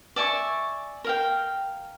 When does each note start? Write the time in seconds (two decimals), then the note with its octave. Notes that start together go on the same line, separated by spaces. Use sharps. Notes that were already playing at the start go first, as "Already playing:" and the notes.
0.16 D5 E5 G#5 C#6
1.04 A#4 F5 G5